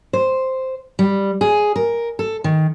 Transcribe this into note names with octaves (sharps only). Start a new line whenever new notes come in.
C5
G3
G#4
A#4
A4
D#3